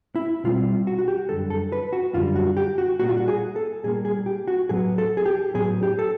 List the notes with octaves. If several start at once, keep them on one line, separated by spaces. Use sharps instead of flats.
E4
B2 G3 C4 F4
F#4
F#4
G4
F#2 D3 G3 A4
A4
B4
F#4
F#2 D3 G3 F4
F#4
G4
F#4
A#2 G3 A#3 F#4
F4
F#4
G#4
A4
A#2 G3 A#3 G#4
G#4
G4
F#4
A2 F#3 B3 G#4
A4
G#4
G4
A2 F#3 B3 G#4
G4
A4